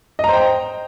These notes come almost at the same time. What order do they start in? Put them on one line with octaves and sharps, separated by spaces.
D#5 A#5 C5 G5